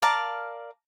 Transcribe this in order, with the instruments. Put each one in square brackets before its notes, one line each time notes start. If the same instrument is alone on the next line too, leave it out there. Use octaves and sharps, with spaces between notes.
[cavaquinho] A#4 D5 F5 A5